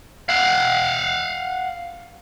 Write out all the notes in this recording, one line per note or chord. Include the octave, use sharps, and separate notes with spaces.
F5 F#5